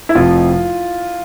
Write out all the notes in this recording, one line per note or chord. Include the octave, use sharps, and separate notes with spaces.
E4
F1 F2 C3 F3 F4